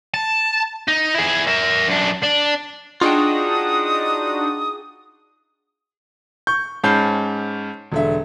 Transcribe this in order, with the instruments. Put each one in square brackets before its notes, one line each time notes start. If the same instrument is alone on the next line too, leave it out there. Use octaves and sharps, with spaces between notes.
[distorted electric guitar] A5
D#4
E4 G#4
A#4 E5
F#2 D4
D4
[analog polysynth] D4 D#4 F#4 [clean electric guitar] F4 G#4 G5 [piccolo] D#6
[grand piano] C#6 [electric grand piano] G6
[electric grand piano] G#2 C#4 G6 [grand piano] A5 B5 C7
[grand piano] E1 D3 E5